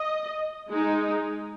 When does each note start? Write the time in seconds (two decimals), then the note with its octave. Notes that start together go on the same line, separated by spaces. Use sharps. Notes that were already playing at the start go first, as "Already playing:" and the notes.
Already playing: D#5
0.70 G#3 D#4